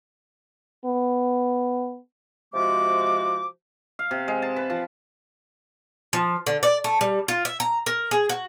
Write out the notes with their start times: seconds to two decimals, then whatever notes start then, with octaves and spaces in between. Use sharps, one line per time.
0.86 B3
2.54 C3 F3 G#3 F#4 D6
3.99 F5
4.11 C3
4.28 G#3
4.42 A5
4.56 B4
4.70 F3
6.13 F3
6.47 D3
6.63 D5
6.84 A3
7.01 G3
7.28 F4
7.45 E5
7.60 A#5
7.86 A#4
8.11 G#4
8.29 F#4